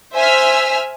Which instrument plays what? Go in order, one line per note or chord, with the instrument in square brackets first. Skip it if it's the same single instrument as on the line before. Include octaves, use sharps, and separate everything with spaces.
[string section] C5 E5 G#5 E6 F6 B6